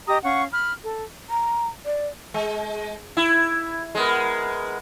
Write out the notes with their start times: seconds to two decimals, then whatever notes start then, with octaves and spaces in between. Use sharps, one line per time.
0.07 G4 D#5 A#5 D#6
0.23 C#4 F5 F#5 C#6
0.52 B5 F6
0.83 A4
1.30 A#5
1.85 D5
2.34 G#3
3.17 E4
3.95 G#3 B3 A#4